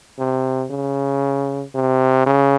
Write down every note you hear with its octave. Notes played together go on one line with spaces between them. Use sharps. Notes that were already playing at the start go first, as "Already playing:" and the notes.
C3
C#3
C3
C#3